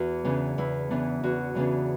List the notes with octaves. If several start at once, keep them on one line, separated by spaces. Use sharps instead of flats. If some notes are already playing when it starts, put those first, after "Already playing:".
Already playing: E2 E3 F#4
C#3 E3 B3 D4
E2 E4
C#3 E3 B3 D4
E2 F#4
C#3 E3 B3 D4